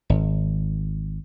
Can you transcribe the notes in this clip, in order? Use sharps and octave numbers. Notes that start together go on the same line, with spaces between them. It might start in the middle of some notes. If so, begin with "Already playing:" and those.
G#1